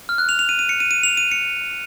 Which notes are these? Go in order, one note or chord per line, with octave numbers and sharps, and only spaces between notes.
F6
F#6
F7
F7
D#7
D#7
C#7
D#7
D#7
F7
D#7
C#7